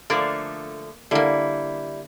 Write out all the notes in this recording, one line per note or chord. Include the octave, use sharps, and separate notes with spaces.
D3 F3 A3 A#3 D5
D3 G3 A#3 E4